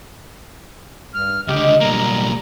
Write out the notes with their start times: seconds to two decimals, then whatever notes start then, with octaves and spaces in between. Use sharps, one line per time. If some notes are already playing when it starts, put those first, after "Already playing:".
1.14 G2 F6
1.48 C#2 D3 G4 D#5
1.81 B1 D3 G3 A#3 A#5